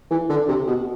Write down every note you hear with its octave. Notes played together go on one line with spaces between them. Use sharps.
E3
D3
C3
B2